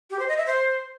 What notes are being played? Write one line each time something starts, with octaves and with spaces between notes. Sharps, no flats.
G4
C5
D#5
E5
C5